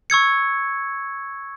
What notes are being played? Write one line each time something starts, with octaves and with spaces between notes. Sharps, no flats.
C#6 E6 G#6 C#7